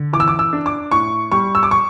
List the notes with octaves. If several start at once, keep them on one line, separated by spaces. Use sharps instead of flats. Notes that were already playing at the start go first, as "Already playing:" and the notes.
Already playing: D3
E3 D6
E6
D6
E6
D4
D6
A2 C#6
G3 C#6
E6
D6
C#6